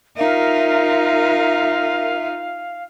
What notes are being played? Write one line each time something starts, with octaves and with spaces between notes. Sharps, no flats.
D#4 F4 A#4 E5 F5